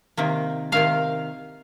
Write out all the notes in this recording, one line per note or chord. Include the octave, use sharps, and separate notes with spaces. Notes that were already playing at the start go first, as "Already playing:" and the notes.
C3 D#3 A#3
C3 D#3 A#3 F5